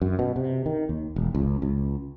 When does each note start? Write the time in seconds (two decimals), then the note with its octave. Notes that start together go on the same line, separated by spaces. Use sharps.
0.02 F#2
0.19 B2
0.36 C3
0.66 D#3
0.89 D#2
1.16 E1
1.35 C#2
1.62 C#2